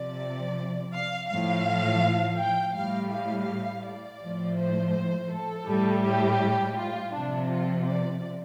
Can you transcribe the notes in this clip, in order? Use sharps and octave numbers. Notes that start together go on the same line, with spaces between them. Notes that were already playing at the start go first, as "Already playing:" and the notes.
Already playing: C3 F3 D5
F5
A2 F3 F5
G5
A2 G3 F5
F5
D5
A2 F3
C5
A4
A2 G3
G4
F4
C3 F3 D4
F4
D5